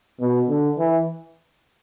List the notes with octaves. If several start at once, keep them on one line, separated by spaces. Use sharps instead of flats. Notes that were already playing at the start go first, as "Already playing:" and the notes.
B2
D3
E3